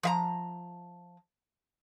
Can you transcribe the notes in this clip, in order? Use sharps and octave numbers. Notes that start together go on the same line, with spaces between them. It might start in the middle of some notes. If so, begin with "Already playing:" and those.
F3 E5 A#5